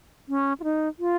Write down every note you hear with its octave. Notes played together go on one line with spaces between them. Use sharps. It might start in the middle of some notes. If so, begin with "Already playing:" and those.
C#4
F4
D#4
F4